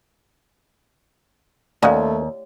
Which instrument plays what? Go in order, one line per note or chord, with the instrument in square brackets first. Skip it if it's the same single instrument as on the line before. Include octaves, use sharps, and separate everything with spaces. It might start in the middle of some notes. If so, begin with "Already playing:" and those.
[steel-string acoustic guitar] D#2 [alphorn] A3 [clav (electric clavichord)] C#4 D#4 F#4 [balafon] D5 F5